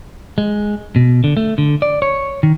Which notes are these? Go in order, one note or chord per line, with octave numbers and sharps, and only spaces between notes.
G#3
B2
D3
A3
D3
D5
C#5
D#3